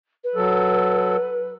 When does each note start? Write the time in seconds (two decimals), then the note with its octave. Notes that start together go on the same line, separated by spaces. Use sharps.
0.24 B4
0.36 F#3 A4